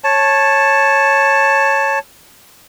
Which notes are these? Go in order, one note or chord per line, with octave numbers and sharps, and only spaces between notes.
C#5 A5